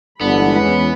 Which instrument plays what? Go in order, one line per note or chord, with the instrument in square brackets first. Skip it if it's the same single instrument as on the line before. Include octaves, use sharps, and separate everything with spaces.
[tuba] G1 [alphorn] D3 [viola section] E3 G#3 B5 [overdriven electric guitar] B3
[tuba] E2 [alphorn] C#4